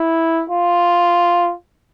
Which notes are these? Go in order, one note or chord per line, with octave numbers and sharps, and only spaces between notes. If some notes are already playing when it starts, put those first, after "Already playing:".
Already playing: E4
F4